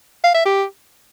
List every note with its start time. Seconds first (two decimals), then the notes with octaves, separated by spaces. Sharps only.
0.24 F5
0.35 E5
0.45 G4